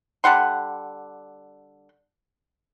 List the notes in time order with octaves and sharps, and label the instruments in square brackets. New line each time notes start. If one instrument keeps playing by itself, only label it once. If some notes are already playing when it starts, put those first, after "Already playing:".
[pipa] D3 G3 F#5 C6